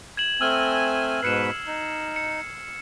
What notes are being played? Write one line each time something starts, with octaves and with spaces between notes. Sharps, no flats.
G#6 E7 F#7
A3 C4 G#5 E6 F6
G#2 B2 B4 C7 C#7 E7
D#4
C#7